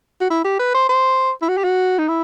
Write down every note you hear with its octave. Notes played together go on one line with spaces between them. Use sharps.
F#4
E4
G4
B4
C5
C5
E4
F#4
G4
F#4
D#4
E4